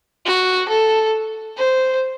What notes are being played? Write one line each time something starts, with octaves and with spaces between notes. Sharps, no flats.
F#4
A4
C5